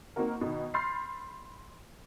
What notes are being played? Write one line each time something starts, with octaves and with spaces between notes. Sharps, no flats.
A#3 C4 D#4 F#4 A#4
B2 D#3
B5 C6 F6 G6 A6 C7